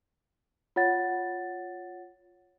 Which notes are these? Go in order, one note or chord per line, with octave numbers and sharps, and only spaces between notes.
F4 C#5 F#5 A6